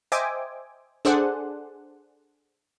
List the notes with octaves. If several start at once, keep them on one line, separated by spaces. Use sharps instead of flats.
C5 D#5 E5 G5 G#5 D6
D4 G#4 A4 C5 D5 F#5